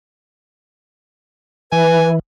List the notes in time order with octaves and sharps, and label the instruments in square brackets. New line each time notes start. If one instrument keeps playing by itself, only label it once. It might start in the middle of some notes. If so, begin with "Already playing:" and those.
[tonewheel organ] E3 [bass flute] B4 [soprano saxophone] G#5